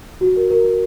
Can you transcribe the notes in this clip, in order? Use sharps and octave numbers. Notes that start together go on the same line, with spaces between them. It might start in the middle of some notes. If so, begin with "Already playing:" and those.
F#4
A#4
A#4
A#4